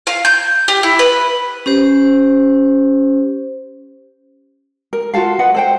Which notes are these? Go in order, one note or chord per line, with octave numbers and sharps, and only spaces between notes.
F5
G6
G4
E4
B4
C#4 G4 C5
A#4
F4 F#4 A4 F5
B4 D#5 F#5
A4 C5 G5